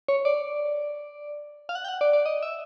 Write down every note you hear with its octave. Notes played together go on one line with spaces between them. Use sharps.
C#5
D5
F5
F#5
G5
F#5
D5
D5
D#5
E5